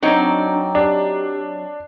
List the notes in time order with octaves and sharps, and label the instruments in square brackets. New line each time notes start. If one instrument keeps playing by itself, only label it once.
[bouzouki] F#3 C4 D#5 [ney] D4 [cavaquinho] D#4 D5
[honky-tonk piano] D4 [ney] G4